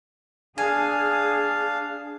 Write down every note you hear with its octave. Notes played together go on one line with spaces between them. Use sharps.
D4 G#4 F5 G#5